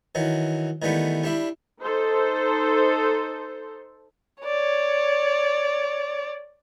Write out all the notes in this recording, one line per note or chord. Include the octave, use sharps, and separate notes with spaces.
D#3 E3 F#3
D#3 E3 G3 A3 B3
G3 D4 E4
D#4 A4 C5
C#5 D5